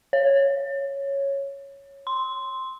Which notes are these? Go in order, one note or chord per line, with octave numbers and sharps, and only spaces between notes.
C#5
C6